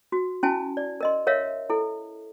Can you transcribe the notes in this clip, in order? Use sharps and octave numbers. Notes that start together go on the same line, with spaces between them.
F#4
C#4 E4 F#4 G#5 A5
D5
A#4 D#5 C6
A#4 C#5 E5 F5
E4 A4